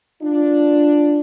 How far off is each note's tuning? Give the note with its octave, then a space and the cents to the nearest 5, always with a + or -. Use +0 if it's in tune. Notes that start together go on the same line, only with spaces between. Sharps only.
D4 +0 F4 +0